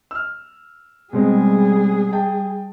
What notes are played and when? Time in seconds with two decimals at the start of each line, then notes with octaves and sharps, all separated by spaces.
0.11 E6 F6
1.13 B2 G3 G#3 C4 G#4
2.13 G5 A5